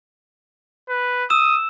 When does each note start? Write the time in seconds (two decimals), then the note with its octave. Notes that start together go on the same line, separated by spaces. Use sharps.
0.89 B4
1.30 D#6 E6 E7